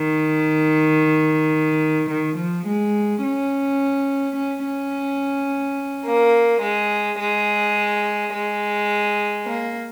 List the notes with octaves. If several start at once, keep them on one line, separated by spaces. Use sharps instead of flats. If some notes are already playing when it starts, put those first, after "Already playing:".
Already playing: D#3
D#3
F3
G#3
C#4
C#4
C#4
A#3
G#3
G#3
G#3
A#3